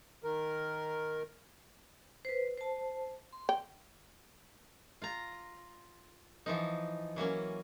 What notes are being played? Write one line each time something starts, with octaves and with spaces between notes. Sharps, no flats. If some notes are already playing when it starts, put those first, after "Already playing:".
D#3 A#4
B4 C5
C5 A5
C6
G5
F4 A#5
E3 F3 D#4
E3 F#3 A#3 C#4